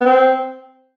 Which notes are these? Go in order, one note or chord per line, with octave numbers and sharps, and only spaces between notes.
B3
C4